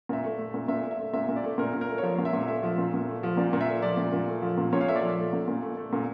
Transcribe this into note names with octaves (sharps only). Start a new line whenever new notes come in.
A#2 E5
A3
A3
A#2
A#2 E5
A3
E5
A3
A#2 E5
A#2
D5
A3
A#2 A#4
A#2
A#4
A3
C#5
F3 A#4
A#2 F5
E5
A#2
A3 E5
F3
A#2
A#2
A3
F3
A#2 D5
A#2
E5
A3
F3 D5
A#2
A#2
A3
F3
A#2
A#2 C#5
F5
A3 E5
D5
F3
A3
A#2
A#2
A3
A3
A#2